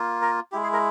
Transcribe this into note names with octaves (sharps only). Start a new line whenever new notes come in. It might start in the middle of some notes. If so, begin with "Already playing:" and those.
Already playing: A#3 F4
A#4
G#3 E4 G4
G#4
A#4